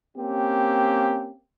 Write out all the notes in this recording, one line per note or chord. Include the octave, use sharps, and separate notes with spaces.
A#3 C4 C#4 G4